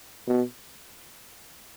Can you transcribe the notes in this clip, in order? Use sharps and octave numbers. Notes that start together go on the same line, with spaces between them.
B2